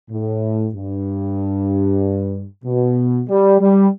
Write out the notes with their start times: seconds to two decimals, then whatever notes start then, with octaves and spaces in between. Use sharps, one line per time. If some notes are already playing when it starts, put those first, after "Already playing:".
0.10 A2
0.74 G2
2.64 B2
3.28 G3
3.60 G3